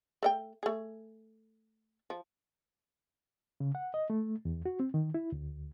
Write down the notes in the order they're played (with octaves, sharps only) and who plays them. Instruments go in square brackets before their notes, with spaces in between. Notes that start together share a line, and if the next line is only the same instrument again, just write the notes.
[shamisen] A3 D#5 G5
A3 G#4
F3
[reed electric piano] C#3
F#5
D#5
A3
E2
F#4
C4
D#3
E4
D2